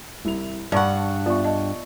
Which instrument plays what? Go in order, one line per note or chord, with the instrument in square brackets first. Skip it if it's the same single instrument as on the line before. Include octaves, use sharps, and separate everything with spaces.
[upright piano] C2 E4 F7
[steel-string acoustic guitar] G2 F#5 [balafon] D5 B5 [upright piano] A5 C#6
[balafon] B3 F4 [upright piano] D5 E5 C#6
[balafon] D#5 A5